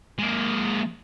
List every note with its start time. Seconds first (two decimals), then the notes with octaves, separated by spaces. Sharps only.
0.19 G#3 A#3